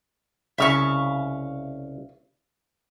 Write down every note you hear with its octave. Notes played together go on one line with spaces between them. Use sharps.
C2 C#3 E5 F5 C#6